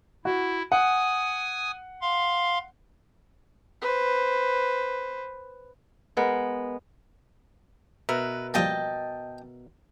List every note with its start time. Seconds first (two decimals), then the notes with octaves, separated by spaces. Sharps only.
0.25 E4 F#4
0.72 F#5 G#5 D#6
2.02 F5 C6
3.82 B4 C5
6.17 G#3 B3 A#4
8.09 B2 A#4 B4 E5
8.54 F3 G3 A#3 D#5 G5 A5